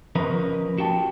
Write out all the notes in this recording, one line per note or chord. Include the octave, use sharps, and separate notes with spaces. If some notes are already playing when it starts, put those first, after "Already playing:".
F3 C#4 A#4 B4 D#5
F#4 G4 G5 A5